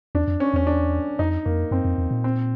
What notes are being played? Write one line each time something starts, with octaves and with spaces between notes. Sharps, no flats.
E2 D4
F2
C#4
E2 C#4
D4
F2 D#4
F2 A#3
F#2 C4
F2
E2
A#2
C4